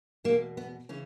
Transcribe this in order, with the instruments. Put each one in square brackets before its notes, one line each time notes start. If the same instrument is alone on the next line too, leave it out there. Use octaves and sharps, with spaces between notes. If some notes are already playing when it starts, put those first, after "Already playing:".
[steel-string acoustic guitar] E2 B2 A#3
B3
C#3 E3 C#4